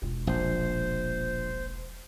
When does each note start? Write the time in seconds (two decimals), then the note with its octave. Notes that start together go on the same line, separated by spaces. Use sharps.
0.02 E1 F4
0.27 A#1 C5